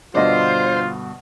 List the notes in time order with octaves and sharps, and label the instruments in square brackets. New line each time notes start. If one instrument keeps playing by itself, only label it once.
[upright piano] G2 B2 D3 [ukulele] D4 D#5 [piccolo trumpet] F4 [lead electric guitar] C5